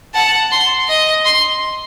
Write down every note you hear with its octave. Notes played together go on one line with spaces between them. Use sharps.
F#5 A5
C6
D#5
C6